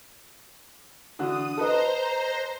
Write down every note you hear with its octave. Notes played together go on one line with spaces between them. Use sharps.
D3 E3 F#4 D#6
A4 B4 C5 D#5 A#5